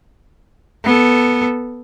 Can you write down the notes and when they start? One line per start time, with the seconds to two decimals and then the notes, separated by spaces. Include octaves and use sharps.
0.84 B3 A4